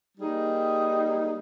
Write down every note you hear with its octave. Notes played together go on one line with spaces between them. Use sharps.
G3 A#3 D#4 G#4